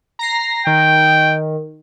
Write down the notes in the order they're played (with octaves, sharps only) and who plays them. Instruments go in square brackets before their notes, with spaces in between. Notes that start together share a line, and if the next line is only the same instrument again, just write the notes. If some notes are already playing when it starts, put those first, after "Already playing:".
[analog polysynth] A#5 A#6 C7
[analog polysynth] D#3 [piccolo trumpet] G5